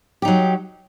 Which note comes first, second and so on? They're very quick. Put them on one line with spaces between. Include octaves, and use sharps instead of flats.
G4 D#4 F#3